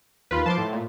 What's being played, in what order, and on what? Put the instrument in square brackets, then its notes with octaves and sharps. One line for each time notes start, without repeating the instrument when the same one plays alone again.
[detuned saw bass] D#2 [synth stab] F4 B4
[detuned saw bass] F3 [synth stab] A5 C6 D6
[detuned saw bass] A2
[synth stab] A#2